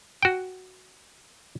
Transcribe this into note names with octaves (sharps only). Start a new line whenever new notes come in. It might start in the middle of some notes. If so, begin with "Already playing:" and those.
F#4 G5